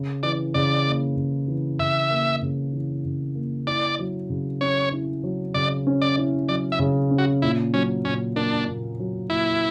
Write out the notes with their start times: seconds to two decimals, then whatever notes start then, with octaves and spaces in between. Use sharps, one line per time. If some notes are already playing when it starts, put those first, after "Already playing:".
Already playing: C#3
0.23 E3 D5
0.54 C#3 D5
0.86 A#3
1.17 C#3
1.48 E3
1.79 C#3 E5
2.11 A#3
2.42 C#3
2.73 E3
3.05 C#3
3.35 A#3
3.67 E4 D5
3.99 F#3
4.30 C#3
4.61 C#4 C#5
4.92 E4
5.23 F#3
5.54 C#3 D5
5.87 C#4
6.02 D5
6.17 E4
6.49 F#3 D5
6.72 E5
6.79 C#3
7.11 C#4
7.18 F#4
7.42 A#2 E4
7.74 F#3 C#4
8.05 A#2 C#4
8.36 A#3 D4
8.68 A#2
8.99 F#3
9.29 A#2 E4